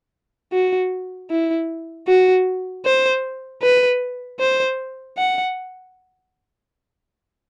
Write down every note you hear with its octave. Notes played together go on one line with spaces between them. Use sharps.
F#4
E4
F#4
C5
B4
C5
F#5